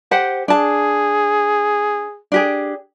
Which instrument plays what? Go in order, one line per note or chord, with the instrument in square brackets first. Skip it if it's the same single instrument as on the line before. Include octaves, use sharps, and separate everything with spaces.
[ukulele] G4 C5 F#5
[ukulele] D4 A5 [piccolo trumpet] G#4
[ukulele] D4 G4 G#4